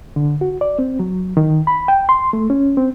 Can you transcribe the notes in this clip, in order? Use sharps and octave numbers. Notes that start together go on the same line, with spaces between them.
D3
F#4
D5
C4
F#3
D#3
B5
G5
C6
A3
C#4
C4